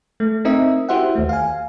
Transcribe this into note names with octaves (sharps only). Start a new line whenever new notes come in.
A3
C4 D#4 A#4 D#5 E5
E4 F#4 G4 C5 E5 F#5
D#2 A3
F5 G#5